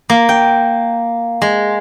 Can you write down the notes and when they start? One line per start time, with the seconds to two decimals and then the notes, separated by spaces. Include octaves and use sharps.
0.10 A#3
0.29 G5
1.42 G#3